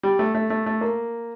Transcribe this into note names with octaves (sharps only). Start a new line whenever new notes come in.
G3
A3
A3
A3
A3
A#3